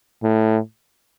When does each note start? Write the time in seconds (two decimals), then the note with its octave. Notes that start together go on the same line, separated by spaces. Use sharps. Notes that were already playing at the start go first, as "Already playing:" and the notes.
0.23 A2